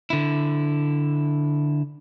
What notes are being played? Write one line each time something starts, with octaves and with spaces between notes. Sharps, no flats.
D3 E4